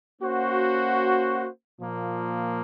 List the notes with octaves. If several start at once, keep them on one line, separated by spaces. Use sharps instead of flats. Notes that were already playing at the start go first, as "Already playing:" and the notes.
A#3 C#4 F#4 C5
A#2 F3 A#3